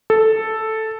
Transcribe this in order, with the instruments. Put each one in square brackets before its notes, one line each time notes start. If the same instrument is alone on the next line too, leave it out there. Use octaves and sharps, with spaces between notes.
[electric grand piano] A4